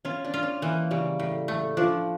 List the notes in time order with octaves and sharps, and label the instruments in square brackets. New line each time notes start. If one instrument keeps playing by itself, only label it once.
[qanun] C#4 [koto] F4
[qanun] D4
[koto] F4
[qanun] C#4
[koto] E3 [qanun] A#3
[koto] C#3 [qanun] G3
[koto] A2
A3
[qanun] F3 [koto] D4